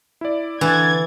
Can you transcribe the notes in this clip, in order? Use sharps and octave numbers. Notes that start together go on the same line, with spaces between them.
E4 D5
D3 E3 G#6 A6